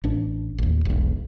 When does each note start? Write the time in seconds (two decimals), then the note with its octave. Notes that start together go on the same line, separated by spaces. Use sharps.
0.04 A1 D4
0.58 A1 D#2
0.85 E1 B1